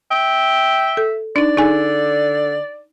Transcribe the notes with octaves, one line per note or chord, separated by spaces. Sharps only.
E5 G5
A4
D4 D#4 D5
D3 D#4 G#4 G#5